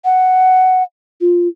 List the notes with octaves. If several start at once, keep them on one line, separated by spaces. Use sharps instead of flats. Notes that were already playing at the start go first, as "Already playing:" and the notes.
F#5
F4